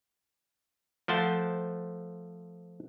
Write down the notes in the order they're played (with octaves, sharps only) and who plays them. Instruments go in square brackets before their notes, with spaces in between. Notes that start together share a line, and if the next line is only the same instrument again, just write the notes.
[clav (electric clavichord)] F3 A3 C5 F#5 A5